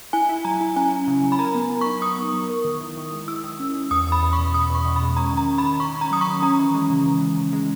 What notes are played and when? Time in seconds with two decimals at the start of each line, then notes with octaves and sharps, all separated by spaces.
0.13 E4 G#5
0.29 E4
0.45 F#3 A#5
0.61 E4
0.76 C#4 G#5
0.92 C#4
1.07 C#3
1.23 F#3
1.32 B5
1.39 A#4 A#5
1.55 B3
1.70 B3
1.81 D#4 C#6
2.02 B3 D#6
2.18 B3
2.34 F#3
2.50 A#4
2.65 D#3
2.80 E4
2.97 D#3
3.12 G#3
3.28 E4 E6
3.44 D#3
3.60 C#4
3.75 C#4
3.91 E2 D#6
4.07 E2
4.12 B5
4.22 E2
4.33 C#6
4.38 B2
4.54 E2 D#6
4.70 E2 C#6
4.85 B2
4.96 B5
5.01 G#3
5.16 C#4 A#5
5.32 D#3 A#5
5.48 D#3
5.58 B5
5.64 D#3
5.80 C#4 C#6
5.95 C#4
6.01 A#5
6.11 F#3 D#6
6.21 C#6
6.27 D#3
6.42 C#4 A#5
6.58 E3
6.74 G#3
6.90 C#3
7.06 E3
7.21 E3
7.37 C#3
7.53 G#3